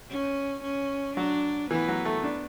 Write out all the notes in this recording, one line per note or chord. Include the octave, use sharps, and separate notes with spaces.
C#4
C#4
F#3 D4
E3 B3
F#3
A3
D4